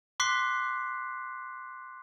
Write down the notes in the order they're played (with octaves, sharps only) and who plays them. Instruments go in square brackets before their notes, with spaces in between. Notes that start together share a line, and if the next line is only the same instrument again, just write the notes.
[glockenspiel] C6 D6 F#6 B6 C7